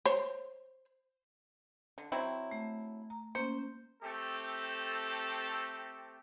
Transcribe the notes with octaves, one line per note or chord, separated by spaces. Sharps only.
C5 C#5
D3
F#3 C4 E4
A3
A#5
A#3 C#4 C5
A3 C4 G4 A4